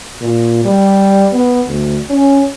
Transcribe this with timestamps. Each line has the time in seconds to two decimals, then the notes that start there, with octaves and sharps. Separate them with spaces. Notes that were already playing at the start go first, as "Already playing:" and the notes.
0.21 A#2
0.65 G3
1.32 B3
1.68 D2
2.10 C#4